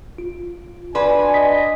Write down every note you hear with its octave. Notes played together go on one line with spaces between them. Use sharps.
F4
D4 F#4 B4 G#5 C6
D#5 B6